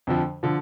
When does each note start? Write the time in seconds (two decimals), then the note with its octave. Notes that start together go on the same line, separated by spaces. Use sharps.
0.07 F2 D3 F3
0.43 D3 F3